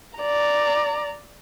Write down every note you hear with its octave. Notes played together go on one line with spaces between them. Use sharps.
D5 A#5